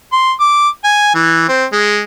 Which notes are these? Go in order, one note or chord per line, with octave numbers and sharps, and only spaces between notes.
C6
D6
G#5
E3
C4
G#3